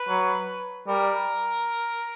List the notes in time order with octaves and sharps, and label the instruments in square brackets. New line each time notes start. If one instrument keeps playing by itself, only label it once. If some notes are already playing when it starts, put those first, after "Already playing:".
Already playing: [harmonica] B4
[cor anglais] F#3
[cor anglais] G3 [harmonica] A#4